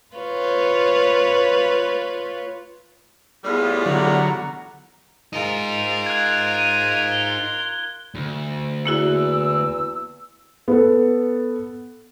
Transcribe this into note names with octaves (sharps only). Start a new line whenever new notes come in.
F4 B4 C#5
A2 G3 B3 F4 G#4
D3 F#3 F#5 A#5
D#4 F4 G#4 A#4
F#6 G#6
D#7
G7
D2
E2 A#3 E4 F#4 E6
B3 A4